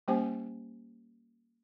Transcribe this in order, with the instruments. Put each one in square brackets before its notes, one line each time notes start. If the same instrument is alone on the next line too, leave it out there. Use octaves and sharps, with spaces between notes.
[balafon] G3 A#3 C#4 G4 C5 G#5